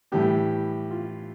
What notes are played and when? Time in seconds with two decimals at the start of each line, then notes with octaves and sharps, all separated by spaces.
0.12 A2 E3 G3 G4
0.91 F4